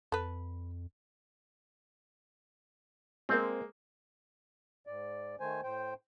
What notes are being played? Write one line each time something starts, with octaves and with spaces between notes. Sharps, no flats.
F2 A4 B4
G#3 A#3 C4
G#2 D5
D#3 A3 C5 G#5
A2 C5 G5